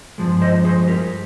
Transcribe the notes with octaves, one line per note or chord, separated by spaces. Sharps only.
G2 F3 G#3
C5 D#5
G#4 C5
G4 A#4